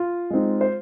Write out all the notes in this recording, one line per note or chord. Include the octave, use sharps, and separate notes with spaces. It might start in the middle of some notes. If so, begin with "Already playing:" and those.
Already playing: F4
G#3 C4 D#4
C5